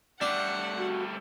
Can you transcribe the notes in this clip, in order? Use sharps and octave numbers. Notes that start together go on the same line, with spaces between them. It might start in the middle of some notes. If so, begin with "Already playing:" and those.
G3 A3 D4 F#5
F#4